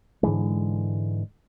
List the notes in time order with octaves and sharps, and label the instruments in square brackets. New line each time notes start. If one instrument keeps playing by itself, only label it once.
[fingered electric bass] G#2 D3 E3 G#3